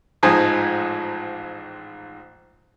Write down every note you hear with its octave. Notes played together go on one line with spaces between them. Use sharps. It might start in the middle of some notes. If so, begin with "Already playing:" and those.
A1 G#2 F3 D#4 G#5